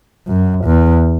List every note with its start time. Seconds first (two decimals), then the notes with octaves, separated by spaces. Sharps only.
0.27 F#2
0.65 E2